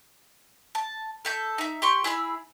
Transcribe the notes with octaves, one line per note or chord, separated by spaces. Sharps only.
A5
A4 E5 G6
D#4 E5
G4 C6 C#6
E4 G#4 B5 E6